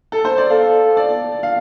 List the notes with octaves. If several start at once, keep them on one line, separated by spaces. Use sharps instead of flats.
A4
C5
D5
A4 F5
D5
F5